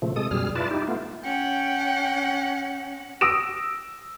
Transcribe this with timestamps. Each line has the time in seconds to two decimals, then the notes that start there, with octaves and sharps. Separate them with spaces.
0.02 A#2 C#3 F3 A3
0.16 C3 G#3 A4 D#6
0.31 F#2 B2 G3 G#4 F6
0.55 E4 F4 B4 D5 A5
0.71 D#4 E4 G4
0.88 A3 B3 F4
1.23 C#4 F#5 G5
3.21 D#6 E6 A#6 D7 E7